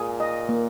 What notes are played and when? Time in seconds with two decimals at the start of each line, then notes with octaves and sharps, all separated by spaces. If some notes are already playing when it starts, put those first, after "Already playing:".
Already playing: A#2 G#4
0.20 D#5
0.49 A#3